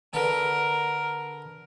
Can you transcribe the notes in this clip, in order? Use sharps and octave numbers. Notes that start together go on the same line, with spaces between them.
D3 A#4 B4